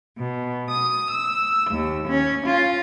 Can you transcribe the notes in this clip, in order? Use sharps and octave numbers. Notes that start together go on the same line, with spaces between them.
B2
D#6
E6
D#2
C#4
F4